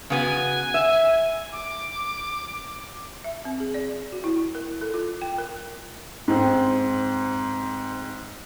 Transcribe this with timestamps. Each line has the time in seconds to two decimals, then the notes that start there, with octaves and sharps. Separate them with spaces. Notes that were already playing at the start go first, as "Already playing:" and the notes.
0.10 C#3 B3 F#4 G#5
0.74 E5
1.52 D6
3.24 E5
3.45 C4
3.60 G#4
3.74 D5
4.12 F#4
4.24 E4
4.55 A#4
4.81 A4
4.94 F4
5.22 G5
5.38 A#4
6.28 G#2 C4